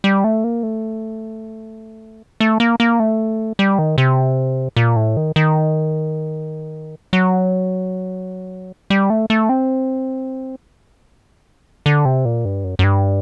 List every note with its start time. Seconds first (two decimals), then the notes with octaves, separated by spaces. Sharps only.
0.04 G3
0.24 A3
0.44 A#3
0.63 A3
2.40 A3
2.60 A#3
2.80 A#3
3.00 A3
3.59 G3
3.79 D#3
3.98 C3
4.76 A#2
4.96 A2
5.17 D#3
5.36 D#3
7.13 F#3
8.90 G3
9.10 A3
9.30 A3
9.49 C4
11.86 D3
12.05 C3
12.25 A#2
12.45 G2
12.64 F#2
12.79 F#2
12.84 G2